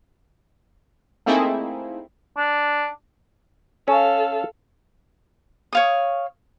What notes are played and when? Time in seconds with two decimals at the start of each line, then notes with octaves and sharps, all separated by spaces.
1.26 A3 A#3 C4 D#4 E4 G#4
2.37 D4
3.88 C#4 A4 F5
5.73 C#5 F5 D#6